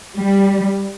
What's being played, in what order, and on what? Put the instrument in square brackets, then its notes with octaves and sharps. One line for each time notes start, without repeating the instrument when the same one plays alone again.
[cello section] G3